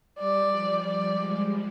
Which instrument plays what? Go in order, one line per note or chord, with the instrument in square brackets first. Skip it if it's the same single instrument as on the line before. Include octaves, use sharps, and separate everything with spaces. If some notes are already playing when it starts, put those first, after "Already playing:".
[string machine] G3 [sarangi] D5
[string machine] F3
[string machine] G3 [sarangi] D5
[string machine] G#3